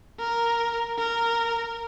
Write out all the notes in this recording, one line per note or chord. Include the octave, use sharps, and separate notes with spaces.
A#4
A#4